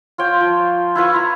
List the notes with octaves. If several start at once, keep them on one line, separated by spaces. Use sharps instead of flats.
F4 C#5 G5
F3
E4 F4 B4 C#6
E4 A#5